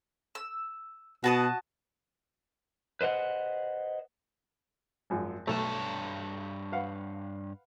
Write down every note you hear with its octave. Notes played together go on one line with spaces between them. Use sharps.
E6
B2 F#4 A5 D#6
B4 C5 D#5 F#5
G#1 F#2 F3
B1 G2 A3 C#5 A5
B4 F5 F#5